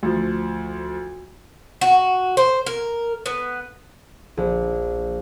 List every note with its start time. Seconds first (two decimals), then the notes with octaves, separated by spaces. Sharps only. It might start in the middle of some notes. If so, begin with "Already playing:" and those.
0.03 D2 F3
1.81 F#4
2.37 C5
2.66 A#4
3.26 B3
4.37 A#1